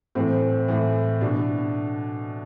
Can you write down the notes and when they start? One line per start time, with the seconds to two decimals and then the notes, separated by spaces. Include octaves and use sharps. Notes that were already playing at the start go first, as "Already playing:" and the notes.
0.15 A2 E3 C4
0.68 A2 E3
1.21 B2 D4